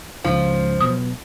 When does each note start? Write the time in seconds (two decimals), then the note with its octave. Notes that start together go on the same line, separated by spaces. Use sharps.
0.24 C#2 G#2 C#3 F3
0.81 B2 F#3 B3 D#6